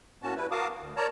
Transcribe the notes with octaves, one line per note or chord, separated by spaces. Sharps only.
A2 A#3 C#4 F#4 A5
G3 E4 B4
F#4 A#4 F5 A5 D6 D#6
D2
A#4 C#5 D5 A5 A#5